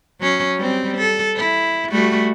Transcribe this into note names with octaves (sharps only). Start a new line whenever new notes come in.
F#3 C#4
G3 C4
A4
E4
G3 A3 F#4